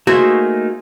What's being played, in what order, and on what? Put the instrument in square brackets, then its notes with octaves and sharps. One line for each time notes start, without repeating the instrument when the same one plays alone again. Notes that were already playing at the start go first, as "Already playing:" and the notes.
[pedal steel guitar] A3 A#3 D#4 [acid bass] F#4 [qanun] G#4 C5 E5